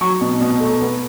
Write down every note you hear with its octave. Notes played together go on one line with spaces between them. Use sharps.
F#3 C#6
B2
B2
A3
B3